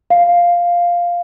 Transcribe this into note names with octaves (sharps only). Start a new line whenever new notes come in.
F5